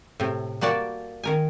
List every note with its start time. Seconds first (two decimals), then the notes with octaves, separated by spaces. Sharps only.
0.20 A2 C3
0.61 G3 A#3 F#4 D5 A5
1.23 D#3 A#4 G#5